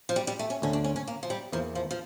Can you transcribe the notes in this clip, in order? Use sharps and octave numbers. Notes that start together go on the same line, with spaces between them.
F3
G3
G3
A3
C#4
D2 D3 A3 C#4
D4
C#4
C#4
A#3
F3
G3
E2 E3 F3 A#3
F3
F3